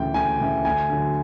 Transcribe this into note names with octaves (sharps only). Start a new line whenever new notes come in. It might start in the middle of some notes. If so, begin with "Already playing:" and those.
Already playing: D2 C#3 E3 G5
D2 G#5
C#3 E3
D2 G#5
D3 F#3